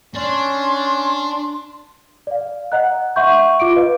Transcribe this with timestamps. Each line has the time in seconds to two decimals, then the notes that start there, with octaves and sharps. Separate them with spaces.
0.15 C#4 D4 C6
2.27 D5 F5
2.72 D#5 F#5 A#5 F#6
3.16 E5 F#5 C6 C#6 G6
3.60 F4 D6 D7
3.76 B4 D#5 F5